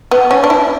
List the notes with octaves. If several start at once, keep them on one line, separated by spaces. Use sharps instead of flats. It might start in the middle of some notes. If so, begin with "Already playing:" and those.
B3
C#4
D4
E4